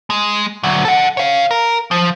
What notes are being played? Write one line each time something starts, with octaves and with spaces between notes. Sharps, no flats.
G#3
D3 F#3
A4 F#5
C#5 F5
A#4
F3